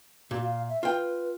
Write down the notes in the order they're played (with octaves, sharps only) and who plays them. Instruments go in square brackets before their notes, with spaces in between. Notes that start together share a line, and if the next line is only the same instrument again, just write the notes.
[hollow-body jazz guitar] A#2 [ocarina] F#4
[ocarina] F5
E5
[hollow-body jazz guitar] F4 G5 [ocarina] B4